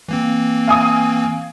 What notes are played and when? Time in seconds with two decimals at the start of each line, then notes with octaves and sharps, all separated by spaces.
0.08 E3 A#3 C4
0.68 F5 G#5 D#6